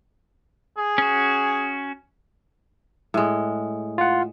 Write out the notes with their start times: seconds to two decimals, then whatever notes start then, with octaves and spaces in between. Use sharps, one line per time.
0.78 G#4
0.98 C#4 F#4
3.14 A2 G#3
3.98 F4 F#5